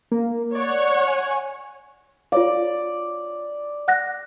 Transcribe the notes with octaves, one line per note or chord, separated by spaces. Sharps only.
A#3
C#5 D5 F#5
G#5
F4 C#5 D5 F5
F#5 F#6 A#6